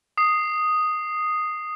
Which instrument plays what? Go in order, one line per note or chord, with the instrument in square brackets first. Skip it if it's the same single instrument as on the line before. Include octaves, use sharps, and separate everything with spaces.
[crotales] D#6 C7